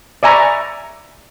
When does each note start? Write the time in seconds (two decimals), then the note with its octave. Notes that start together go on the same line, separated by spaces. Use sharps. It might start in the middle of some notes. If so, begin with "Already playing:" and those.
0.23 D5 E5 G#5 A#5 B5 C#6